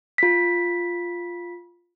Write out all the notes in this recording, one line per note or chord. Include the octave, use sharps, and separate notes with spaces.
F4 B6